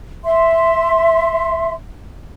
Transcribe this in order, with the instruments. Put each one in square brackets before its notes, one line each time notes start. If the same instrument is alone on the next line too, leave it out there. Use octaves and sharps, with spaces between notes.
[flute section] E5 C6